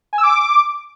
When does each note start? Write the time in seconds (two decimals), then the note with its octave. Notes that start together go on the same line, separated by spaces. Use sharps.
0.13 G#5
0.18 E6
0.23 D6